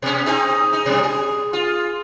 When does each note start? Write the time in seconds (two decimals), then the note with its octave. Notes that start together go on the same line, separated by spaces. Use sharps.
0.02 B2 C#4
0.26 C4 D#4 G#4
0.73 D#4
0.86 B2 G3
1.03 G#4
1.53 F4